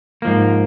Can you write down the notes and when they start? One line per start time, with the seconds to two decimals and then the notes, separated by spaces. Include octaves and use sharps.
0.22 G#2 F3 A#3